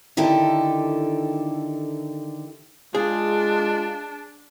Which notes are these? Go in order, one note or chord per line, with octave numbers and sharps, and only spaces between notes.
D3 D#3 E4 G4 A4
G#3 D4 F4 G#4